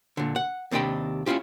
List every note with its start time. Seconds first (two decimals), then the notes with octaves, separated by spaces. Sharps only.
0.17 A#2 D3
0.36 F#5
0.71 D#2 C3 D4 D#5 G5 B5
1.26 C#4 D4 E4 F4 G4